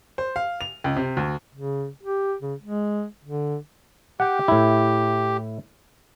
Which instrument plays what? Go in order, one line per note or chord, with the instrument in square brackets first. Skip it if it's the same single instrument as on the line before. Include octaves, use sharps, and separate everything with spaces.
[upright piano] C5
F5
F7
C#2
C3
D2
[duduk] C#3
G4
C#3
G#3
D3
[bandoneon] G4 [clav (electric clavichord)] F#5 G5
[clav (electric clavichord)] A2 E4